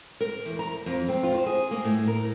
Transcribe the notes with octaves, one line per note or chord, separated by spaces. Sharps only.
A#4
E2
A#5
F2
C4
F4
C5
G#4
A#3
A2
A#4